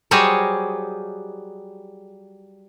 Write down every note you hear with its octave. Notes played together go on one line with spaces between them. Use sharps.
F#3 G3 G#4 C5 C#5 D#5